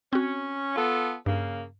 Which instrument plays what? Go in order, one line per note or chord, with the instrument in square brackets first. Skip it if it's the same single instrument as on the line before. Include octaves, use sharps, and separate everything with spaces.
[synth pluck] C4 F#4 [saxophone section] C#4
[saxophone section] B3 F4 A4
[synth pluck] G2 [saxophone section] C#3 A#3